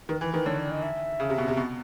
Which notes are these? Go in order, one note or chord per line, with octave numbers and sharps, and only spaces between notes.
D#3 B4
E3 B4
D#3 B4
D3 C#5
D5
D#5
E5
C#3
C3
B2
C3
B2